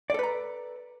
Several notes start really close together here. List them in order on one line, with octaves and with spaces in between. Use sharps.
D5 A4 B4 A#5